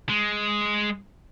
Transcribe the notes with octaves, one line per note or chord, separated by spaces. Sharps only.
G#3